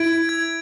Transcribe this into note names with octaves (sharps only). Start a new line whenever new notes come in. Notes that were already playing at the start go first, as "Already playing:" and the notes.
Already playing: E4 G#6 D7
G#6